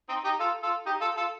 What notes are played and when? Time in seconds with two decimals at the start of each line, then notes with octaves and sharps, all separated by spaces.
0.09 C4 D#4
0.24 D#4 G4
0.40 F4 A4
0.63 F4 A4
0.86 D#4 G4
1.01 F4 A4
1.17 F4 A4